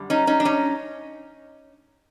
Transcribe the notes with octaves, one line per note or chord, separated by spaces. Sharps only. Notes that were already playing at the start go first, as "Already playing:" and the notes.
Already playing: F#2 D3 G3
C#4 D#4
C#4 D#4
D4
C#4 D#4